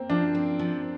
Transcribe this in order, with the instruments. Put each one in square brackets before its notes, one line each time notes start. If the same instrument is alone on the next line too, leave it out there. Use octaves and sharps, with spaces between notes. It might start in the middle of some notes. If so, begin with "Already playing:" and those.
Already playing: [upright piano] A#3 C4
[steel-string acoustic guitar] F3 [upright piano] D4
[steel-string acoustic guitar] C4
F3